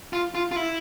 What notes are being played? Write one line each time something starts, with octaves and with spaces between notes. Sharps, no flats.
F4
F4
F4
E4